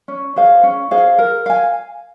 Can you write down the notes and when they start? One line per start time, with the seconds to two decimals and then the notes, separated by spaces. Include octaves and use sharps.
0.08 C#4
0.36 G#4 C5 F5
0.63 C#4
0.91 G#4 C5 F5
1.19 A#4
1.46 F5 G#5